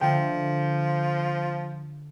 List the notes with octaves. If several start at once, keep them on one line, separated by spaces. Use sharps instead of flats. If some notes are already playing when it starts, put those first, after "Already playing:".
D3 F3 A3 G5